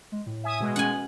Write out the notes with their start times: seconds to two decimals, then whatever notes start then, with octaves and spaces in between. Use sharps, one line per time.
0.12 G#3
0.27 A2
0.44 E5 G#5 D#6
0.60 B2 G#3
0.76 C#4 F#5 G#5